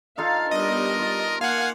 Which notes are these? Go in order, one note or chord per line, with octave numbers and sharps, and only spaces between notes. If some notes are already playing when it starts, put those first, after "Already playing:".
D#4 F4 A4 F5
G3 B3 D4 A#4 D#5
F4
A#3 F5 F#5 G#5